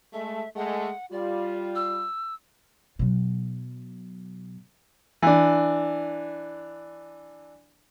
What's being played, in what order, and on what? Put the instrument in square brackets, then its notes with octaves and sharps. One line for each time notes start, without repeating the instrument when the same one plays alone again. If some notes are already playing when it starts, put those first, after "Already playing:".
[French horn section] G#3 A3 [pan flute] E5
[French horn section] G#3 A3 [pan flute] F#5
[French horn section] G3 F4 [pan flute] D5
[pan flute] E6
[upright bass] B2 F#3
[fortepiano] E3 D4